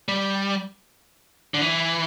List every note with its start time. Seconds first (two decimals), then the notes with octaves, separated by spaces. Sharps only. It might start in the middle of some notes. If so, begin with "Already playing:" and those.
0.08 G3
1.54 D3
1.61 E3